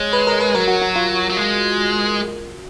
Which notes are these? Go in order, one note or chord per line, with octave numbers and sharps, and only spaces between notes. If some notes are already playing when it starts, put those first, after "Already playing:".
Already playing: G#3 C#5
B4
A#4
B4
F#3 A#4
F#4
F#4
F4
F#3
G#3